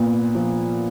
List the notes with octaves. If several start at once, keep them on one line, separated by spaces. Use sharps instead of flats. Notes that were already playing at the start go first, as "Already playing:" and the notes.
Already playing: A#2 B3
F3